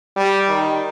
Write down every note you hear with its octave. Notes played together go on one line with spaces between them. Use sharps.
G3
D#3